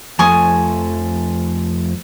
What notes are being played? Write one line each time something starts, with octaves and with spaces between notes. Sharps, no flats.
F2 F3 A3 G#5 C#6 D#6